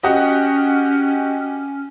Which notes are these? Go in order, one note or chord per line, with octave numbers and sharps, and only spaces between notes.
C#4 F#4 G4 D#5